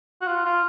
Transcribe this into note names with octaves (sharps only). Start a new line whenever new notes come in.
F#4
F4
F4